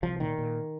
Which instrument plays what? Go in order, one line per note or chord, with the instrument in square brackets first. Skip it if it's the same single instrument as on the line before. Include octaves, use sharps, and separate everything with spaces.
[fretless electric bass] C2 F3
A#2 D#3
A#2